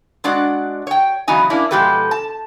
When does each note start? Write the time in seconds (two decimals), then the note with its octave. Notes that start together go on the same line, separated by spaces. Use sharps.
0.24 G#3 D4 F#4 D5 F#5
0.87 C#5 G5
1.28 C#3 E3 F#3 B3 D#4 G#5
1.50 A#3 C#4 D4 E4
1.71 B2 F3 G#3 G4 A4 B4
2.11 A5